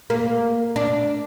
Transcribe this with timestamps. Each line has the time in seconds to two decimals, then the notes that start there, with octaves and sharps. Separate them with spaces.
0.10 A#3
0.76 D4